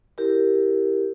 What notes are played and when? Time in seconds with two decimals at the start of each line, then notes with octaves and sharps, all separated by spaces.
0.18 E4 G4 A#4